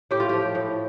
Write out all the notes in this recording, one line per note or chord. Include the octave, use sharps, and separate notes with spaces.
A2 G4
F4
F3 G4
A2